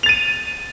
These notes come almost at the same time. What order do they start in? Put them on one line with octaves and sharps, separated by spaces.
F7 A6 D#7